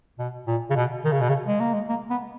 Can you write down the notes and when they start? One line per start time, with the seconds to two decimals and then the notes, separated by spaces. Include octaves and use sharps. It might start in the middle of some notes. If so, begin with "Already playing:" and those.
0.19 B2
0.47 A#2
0.70 C#3
0.76 B2
1.04 D#3
1.12 C#3
1.21 B2
1.29 C#3
1.46 G#3
1.60 A#3
1.74 G#3
1.89 A#3
2.10 B3